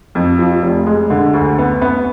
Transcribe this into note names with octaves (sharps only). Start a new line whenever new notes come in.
F2
F3
F1
G#3
D3
D2
B3
B3